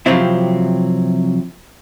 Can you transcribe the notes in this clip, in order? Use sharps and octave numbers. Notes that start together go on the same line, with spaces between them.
C3 F3 F#3 C4 E4